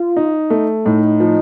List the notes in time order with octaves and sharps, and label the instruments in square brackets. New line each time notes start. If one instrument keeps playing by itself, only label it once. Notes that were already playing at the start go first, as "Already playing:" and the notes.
Already playing: [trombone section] F4
[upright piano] D#4
A3
[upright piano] A2 [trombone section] D#4
[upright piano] F3